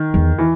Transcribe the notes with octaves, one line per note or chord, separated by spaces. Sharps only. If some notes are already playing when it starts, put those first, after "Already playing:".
Already playing: D#3
E2
E3